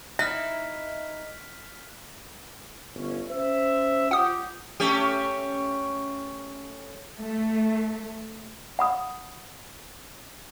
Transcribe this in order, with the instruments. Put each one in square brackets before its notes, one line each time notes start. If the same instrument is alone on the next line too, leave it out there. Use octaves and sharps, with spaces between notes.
[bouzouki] D#4 E4 [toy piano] E5 [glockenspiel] F6 F#6 B6
[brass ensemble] G1 C#4
C#4 C5 E5
[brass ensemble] F4 G4 [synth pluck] F#5 D#6
[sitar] A3 C#4 G4
[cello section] A3
[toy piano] F#5 B5 D#6